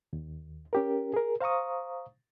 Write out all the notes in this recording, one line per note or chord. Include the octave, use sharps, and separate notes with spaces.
D#2
C#4 G4 A#4
G#4 A#4
C5 F5 A#5 C#6 D#6